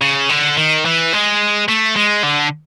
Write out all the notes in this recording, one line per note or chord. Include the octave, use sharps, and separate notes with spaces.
C#3
D3
D#3
E3
G#3
A3
G#3
D3